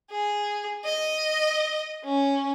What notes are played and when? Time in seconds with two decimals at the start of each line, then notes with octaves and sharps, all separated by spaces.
0.13 G#4
0.85 D#5
2.05 C#4